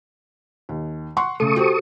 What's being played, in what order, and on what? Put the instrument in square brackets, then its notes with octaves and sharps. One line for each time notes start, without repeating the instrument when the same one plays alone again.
[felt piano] D#2
F#5 C6 C#6
[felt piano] C#3 A3 [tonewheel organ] A4 C#6 D#6
[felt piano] F#4 G4 C5